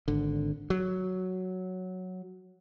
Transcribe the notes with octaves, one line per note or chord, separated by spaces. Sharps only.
G#1 D3
F#3